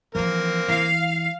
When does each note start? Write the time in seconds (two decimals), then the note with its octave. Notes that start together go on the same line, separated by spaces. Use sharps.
0.15 E3 F3 A#3 C4 A#4
0.68 E3 F5